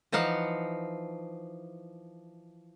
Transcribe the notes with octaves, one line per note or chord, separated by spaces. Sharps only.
E3 F3 D#4 F5 F#5